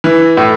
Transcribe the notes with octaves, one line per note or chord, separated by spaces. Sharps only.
E3
A2